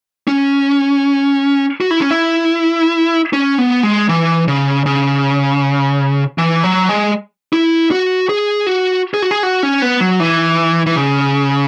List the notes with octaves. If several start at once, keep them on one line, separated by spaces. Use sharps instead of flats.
C#4
F#4
E4
C#4
E4
C#4
B3
G#3
E3
C#3
C#3
E3
F#3
G#3
E4
F#4
G#4
F#4
G#4
F#4
G#4
F#4
C#4
B3
F#3
E3
E3
C#3